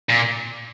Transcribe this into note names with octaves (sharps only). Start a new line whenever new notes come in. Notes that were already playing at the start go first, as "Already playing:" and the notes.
A#2